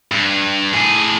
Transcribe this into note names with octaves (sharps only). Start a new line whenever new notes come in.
G2
A2 G#4